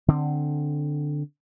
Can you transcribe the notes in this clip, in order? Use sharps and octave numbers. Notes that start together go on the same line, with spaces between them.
D3 C4